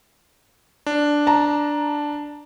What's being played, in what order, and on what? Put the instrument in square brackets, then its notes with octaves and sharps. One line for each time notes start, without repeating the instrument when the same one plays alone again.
[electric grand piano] D4
[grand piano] A5 A#5